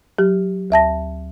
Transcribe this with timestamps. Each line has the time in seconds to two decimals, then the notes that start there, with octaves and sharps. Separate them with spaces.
0.18 F#3 G4
0.70 D2 E5 A5 A#6